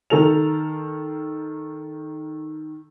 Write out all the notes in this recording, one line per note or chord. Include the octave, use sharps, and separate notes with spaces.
D#3 A4 A#4 F7